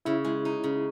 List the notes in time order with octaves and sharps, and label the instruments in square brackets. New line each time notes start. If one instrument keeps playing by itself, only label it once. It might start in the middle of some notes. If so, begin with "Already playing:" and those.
[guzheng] C#3 [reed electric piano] E4
[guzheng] G#3
D#4
C#3